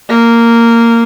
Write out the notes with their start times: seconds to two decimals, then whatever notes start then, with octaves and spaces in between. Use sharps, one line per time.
0.10 A#3